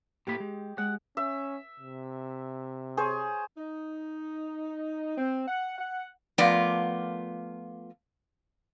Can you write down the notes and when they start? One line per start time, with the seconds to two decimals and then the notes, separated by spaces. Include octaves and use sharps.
0.27 A2 A#3 G4 B5
0.40 G#3
0.78 G#3 F#5
1.17 C#4 E5
1.80 C3
2.97 G#4 C5 C#5
3.57 D#4
5.17 C4
5.47 F#5
5.79 F#5
6.38 F3 A3 B3 F4 A#4 D5